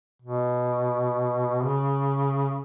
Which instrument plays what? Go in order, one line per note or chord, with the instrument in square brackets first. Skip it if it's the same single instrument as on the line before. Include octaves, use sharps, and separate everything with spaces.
[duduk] B2
C#3